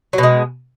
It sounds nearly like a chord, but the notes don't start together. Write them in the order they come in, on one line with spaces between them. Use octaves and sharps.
F#3 B2 G#3